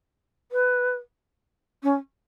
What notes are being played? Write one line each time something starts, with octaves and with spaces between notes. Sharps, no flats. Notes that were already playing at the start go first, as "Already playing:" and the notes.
B4
C#4